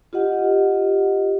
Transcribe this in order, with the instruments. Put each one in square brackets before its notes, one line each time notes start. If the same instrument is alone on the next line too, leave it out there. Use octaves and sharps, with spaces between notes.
[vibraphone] F4 G4 D#5 F#5